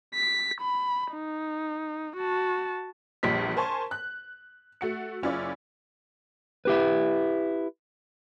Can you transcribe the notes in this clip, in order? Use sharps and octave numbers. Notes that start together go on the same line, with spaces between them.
B6
B5
D#4
F#4 A5
A#1 E2 A#2 G3 B6
A#4 C5 G#5 A5 C6 C#6
F#6
A3 F#4 C#7
F#1 C#4 E4 F4 D5
E4 G4 B4